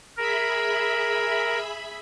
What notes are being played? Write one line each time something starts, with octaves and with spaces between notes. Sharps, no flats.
G#4 A#4 E5 B5